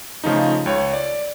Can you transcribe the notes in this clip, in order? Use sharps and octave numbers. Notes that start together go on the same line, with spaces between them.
C#3 F3 A3 D#4
C#2 C#5
D5